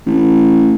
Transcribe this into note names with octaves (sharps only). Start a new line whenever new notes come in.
A1